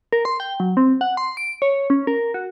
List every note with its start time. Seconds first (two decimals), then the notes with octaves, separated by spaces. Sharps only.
0.13 A#4
0.25 C6
0.40 G5
0.60 F#3
0.77 C4
1.01 F#5
1.17 C6
1.37 D7
1.62 C#5
1.90 C#4
2.07 A#4
2.34 F#4